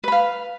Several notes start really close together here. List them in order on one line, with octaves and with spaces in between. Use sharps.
B4 B5 F5